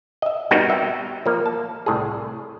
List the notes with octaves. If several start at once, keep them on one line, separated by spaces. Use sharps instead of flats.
D#5 E5
G3 B3 C4 D#4 F#4 A#4
E5 G5
F3 A#3
A5
C2 A2 G#4